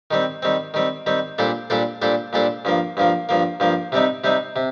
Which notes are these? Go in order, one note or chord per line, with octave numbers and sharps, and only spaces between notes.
D#3 G3 C4
D#3 G3 C4
D#3 G3 C4
D#3 G3 C4
A#2 G3 D4 A4 C5
A#2 G3 D4 A4 C5
A#2 G3 D4 A4 C5
A#2 G3 D4 A4 C5
G2 F3 A#3
G2 F3 A#3
G2 F3 A#3
G2 F3 A#3
C3 G3 C4 D#4
C3 G3 C4 D#4
C3